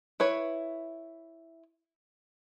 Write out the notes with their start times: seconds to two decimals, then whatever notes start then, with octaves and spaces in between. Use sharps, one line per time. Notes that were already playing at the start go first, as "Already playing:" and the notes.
0.20 E4 B4 C#5